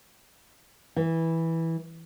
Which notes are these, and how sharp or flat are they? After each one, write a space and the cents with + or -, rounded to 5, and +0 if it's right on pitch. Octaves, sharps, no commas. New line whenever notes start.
E3 -10